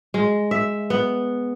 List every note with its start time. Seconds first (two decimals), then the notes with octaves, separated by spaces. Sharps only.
0.14 G#3
0.51 E5
0.90 B3